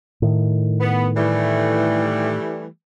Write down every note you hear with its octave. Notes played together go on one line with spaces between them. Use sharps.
A2 D#3
B3
E3 G3 A3